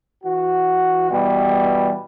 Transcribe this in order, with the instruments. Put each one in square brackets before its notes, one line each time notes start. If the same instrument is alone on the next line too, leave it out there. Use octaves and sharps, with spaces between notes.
[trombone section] E3 F#4
B2 E3 G3